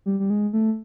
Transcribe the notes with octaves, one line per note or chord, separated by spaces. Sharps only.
G3
G3
G#3
A3